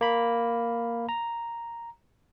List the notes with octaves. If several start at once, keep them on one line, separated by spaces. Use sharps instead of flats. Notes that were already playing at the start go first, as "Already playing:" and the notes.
A#3 B5
A#5